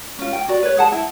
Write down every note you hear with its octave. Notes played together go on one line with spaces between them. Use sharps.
C#4 F4
G5
F#4 D5
B4 C#5
G#4 F#5 A5
E4